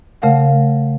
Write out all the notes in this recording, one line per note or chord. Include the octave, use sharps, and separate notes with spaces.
C#3 A3 A#4 F5 F#5